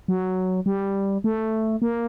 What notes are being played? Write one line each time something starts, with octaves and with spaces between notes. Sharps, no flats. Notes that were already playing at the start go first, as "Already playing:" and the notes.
F#3
G3
A3
A#3